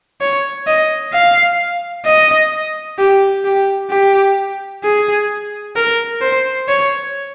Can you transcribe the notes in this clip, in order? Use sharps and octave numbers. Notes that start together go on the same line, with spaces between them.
C#5
D#5
F5
D#5
G4
G4
G4
G#4
A#4
C5
C#5